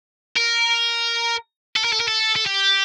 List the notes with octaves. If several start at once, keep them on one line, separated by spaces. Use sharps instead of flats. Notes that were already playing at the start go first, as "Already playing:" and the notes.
A#4
A4
A#4
A4
A#4
A4
A4
G4